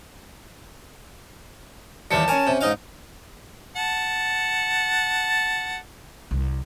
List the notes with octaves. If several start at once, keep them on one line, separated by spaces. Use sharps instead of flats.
D#2 E3 G3 A5 C#7
C#4 A#4 C#5 G#5
C3
G#2 D#4 D#5 F5
F#5 A5
C2